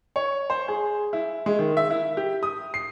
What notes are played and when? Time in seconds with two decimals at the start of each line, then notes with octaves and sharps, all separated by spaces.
0.16 C#5
0.50 C5
0.68 G#4
1.13 E4
1.46 G#3
1.59 D#3
1.77 E5
1.90 E4
2.17 G4
2.43 D#6
2.74 C7